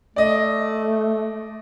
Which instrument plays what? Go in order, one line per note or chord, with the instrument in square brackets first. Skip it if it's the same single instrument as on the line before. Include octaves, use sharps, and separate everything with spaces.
[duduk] A3 [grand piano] D5 D#5